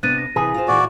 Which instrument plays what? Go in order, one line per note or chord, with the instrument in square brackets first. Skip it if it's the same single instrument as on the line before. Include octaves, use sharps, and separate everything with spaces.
[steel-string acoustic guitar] C3 B3 D4 [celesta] F#6 A6 D#7
[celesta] A#6
[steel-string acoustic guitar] C3 E3 B4 [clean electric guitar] G#4
[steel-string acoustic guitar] F4 F#4 C5
[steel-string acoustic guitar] A#2 E3 E4 [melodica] F#4 D5